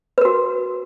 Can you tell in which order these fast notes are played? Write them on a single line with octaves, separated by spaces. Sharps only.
B4 A#4 F#4